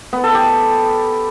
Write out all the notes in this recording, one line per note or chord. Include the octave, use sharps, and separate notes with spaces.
B3
A4
G4